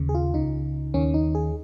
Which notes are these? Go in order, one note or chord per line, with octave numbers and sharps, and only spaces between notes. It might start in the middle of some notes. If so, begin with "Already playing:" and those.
Already playing: D#2 C#3
G#4
F4
C#2 C#3 D#4
D#2 D#3 C#4
D#4
G#4